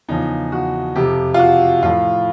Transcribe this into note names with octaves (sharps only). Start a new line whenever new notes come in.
E2 C#3 F3 D#4
F#4
F2 C3 F3 G4
F4
F#4
A2 F3 F4